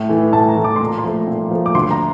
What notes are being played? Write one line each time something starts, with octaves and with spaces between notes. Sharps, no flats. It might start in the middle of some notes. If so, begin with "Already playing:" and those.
Already playing: A2
E3 A3
A2 A5
A#5
E3 A3
D6
A#2 C6
A#5
C6
F3 A3
A#2
F3 A3
D6
D2 C6
A#5